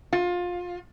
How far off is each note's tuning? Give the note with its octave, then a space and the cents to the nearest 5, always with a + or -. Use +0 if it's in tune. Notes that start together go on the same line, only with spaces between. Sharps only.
F4 +25